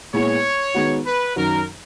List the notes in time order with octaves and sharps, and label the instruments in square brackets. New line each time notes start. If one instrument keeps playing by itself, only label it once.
[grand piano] A#2 G#3 B3 E4 [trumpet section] C#5
[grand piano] D#3 G#3 B3 F#4
[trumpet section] B4
[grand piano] F#2 D#3 F#3 [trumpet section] A#4